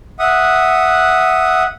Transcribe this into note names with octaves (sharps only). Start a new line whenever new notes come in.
E5 F#5 D#6